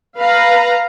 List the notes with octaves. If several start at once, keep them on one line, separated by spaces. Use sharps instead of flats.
B4 F5 A#5